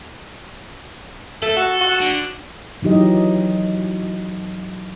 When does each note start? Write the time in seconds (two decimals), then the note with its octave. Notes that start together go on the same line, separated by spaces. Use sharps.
1.42 A3 A4
1.57 F#4
1.81 F#4
2.01 D3
2.82 E3 F#3 D#4 G4 D#5